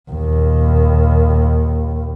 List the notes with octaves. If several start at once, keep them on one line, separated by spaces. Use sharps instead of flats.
D#2 A#2